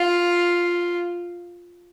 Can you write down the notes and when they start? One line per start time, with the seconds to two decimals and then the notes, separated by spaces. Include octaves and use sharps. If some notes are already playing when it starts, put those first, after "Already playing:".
Already playing: F4